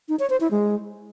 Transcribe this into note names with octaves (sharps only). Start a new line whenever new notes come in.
D#4
C#5
C5
E4
G#3